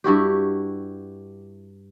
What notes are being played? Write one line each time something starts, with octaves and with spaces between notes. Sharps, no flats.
G2 E4 F#4 G4